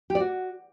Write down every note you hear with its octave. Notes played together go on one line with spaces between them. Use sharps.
G4
D5
F#4